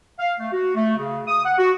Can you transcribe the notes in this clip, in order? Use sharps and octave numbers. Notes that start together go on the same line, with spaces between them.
F5
A3
F#4
A3
C#3
D#6
F#5
F#4